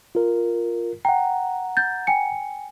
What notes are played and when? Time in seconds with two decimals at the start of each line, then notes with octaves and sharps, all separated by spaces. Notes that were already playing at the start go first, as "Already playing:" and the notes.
0.15 F4 A#4
1.05 F#5 G5 A#5
1.77 G6 A6
2.07 G5 G#5 C#7